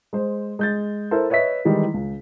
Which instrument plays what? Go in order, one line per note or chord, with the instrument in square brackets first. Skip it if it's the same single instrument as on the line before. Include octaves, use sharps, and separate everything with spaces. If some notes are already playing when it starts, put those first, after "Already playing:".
[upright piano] G#3 C5
G#3 G6 A6
E4 A4 A#4 C5
B4 C#5 D#5 E5 B6
D#3 E3 G3 G#3
C#2